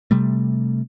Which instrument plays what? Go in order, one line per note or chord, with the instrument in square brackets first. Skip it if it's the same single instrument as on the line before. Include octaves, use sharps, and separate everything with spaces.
[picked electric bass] C3 G3 A3